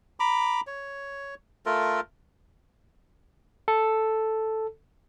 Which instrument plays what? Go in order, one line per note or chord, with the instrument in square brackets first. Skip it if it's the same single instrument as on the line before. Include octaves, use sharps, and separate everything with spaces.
[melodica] A#5 B5 D6
C#5
A3 F4 A4 A#4
[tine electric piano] A4